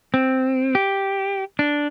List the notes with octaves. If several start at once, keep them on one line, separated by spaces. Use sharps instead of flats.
C4
G4
D4